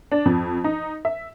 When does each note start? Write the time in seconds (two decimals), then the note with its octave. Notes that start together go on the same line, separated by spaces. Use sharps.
0.12 D4
0.25 F2
0.64 D#4
1.05 E5